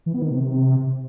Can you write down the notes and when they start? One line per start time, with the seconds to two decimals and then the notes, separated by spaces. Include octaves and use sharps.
0.06 E3
0.14 B3
0.22 D#3
0.30 C3